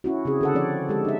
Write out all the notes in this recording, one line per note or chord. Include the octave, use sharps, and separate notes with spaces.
C#4 E4 F#4
C#3 C4 G#4
D3 A4 F#5
F3 C4 C#4 C#5 D5
D3 G#3 G4 A4
D#4 E5